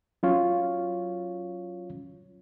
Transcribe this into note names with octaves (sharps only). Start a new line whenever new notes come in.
F#3 C#4 F4 C#5